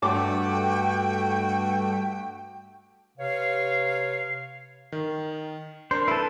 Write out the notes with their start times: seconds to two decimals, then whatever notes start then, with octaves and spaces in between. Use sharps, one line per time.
0.02 G2 A3 F#4 G5 D6
3.18 C3 B4 C#5 F5
4.92 D#3
5.91 D4 A#4 C5
6.08 E4 A4 B4